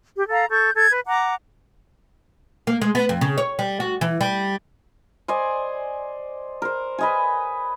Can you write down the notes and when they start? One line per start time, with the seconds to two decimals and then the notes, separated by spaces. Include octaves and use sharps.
0.15 G4
0.29 A4 F5 A#5
0.49 A4 C#6 G6
0.74 A4 G6 G#6
0.91 B4
1.06 F#5 A#5 D6
2.67 A#3
2.81 G#3
2.95 B3
3.09 F2
3.21 C#3
3.38 C#5
3.59 G3
3.80 F#4
4.01 E3
4.21 G3
5.28 C5 D5 D#5 G#5
6.62 A#4 C5
6.98 B4 D#5 G#5